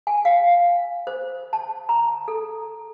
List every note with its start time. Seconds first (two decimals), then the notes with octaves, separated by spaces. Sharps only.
0.07 G#5
0.25 F5
1.07 C5
1.53 A5
1.89 A#5
2.28 A4